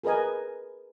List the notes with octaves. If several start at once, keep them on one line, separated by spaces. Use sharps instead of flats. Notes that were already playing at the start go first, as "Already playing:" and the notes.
G#4 A#4 B4 D#5 G#5